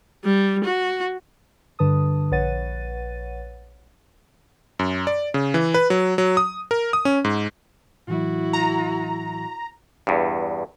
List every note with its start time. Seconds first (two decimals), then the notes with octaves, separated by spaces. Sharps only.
0.25 G3
0.64 F#4
1.79 G2 D3 B4 A5 D#6
2.31 A#1 B4 C#5 F#5 A6 D#7
4.79 F#2
5.07 D5
5.34 C#3
5.54 E3
5.74 B4
5.90 F#3
6.18 F#3
6.37 D#6
6.71 A#4
6.93 D#6
7.05 C#4
7.24 G#2
8.08 A2 E3 F#3 E4 F#4
8.53 A#5
10.07 E2 G2